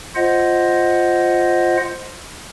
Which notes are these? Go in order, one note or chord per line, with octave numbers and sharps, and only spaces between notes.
F4 C5 D#5 F#5